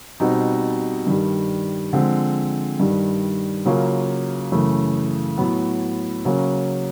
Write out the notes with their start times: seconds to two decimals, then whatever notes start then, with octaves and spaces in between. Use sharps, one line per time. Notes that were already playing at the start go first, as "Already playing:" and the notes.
0.20 B2 G3 C4 D#4
1.07 G2 D#3 G3
1.93 D3 F3 G#3 C4
2.80 G2 D#3 G3
3.66 C#3 F#3 A#3 C#4 F4
4.52 F#2 C#3 E3 A3
5.38 A2 F#3 B3
6.25 C#3 F#3 A#3 C#4